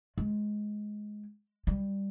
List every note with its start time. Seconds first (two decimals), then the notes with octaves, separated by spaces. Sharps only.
0.18 G#3
1.67 G3